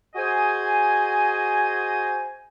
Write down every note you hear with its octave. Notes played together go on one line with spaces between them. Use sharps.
F#4 G#4 C5 D#5 G#5